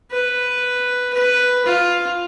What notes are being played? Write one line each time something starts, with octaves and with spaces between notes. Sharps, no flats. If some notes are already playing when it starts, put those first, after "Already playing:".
B4
B4
F4